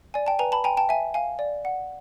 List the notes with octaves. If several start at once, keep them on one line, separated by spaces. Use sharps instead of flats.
D5 G#5
G5 A5
B4 G#5 A#5
A5 B5
G5 G#5 A#5
G5 A5
E5 G#5
F5 G#5
D5
F#5